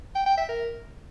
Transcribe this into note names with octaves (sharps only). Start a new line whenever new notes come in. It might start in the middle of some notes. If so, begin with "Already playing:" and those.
G5
G5
E5
A#4